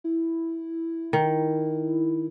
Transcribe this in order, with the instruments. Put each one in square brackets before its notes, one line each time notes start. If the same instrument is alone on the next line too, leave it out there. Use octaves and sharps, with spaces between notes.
[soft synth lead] E4
[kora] D#3